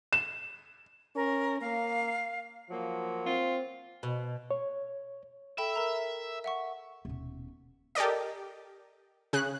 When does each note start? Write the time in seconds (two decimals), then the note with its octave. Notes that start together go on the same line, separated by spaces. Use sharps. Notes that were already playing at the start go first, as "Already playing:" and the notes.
0.13 E7
1.16 C#4 A#4
1.61 A#3 F5
2.70 F3 F#3 A#3
3.26 C4 F4
4.03 B2
4.51 C#5
5.58 A4 E5 G5 B5
5.76 A#4 A#5
6.44 E5 F#5 C#6
7.05 D#1 B2
7.95 G4 A4 A#4 D5 D#5
9.33 C#3 G#4 F#6